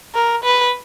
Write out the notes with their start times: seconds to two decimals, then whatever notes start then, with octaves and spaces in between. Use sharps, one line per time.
0.15 A#4
0.44 B4